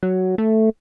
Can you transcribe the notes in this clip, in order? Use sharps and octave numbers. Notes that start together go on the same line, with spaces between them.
F#3
A3